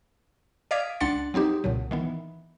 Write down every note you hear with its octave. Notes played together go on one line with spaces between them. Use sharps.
D5 D#5 F5 D6 G#6 B6
C#2 D4 F#5 C6 A6 C#7
F#3 C4 D#4 G4
C2 A#2 C#3 F#3
D#3 E3 B3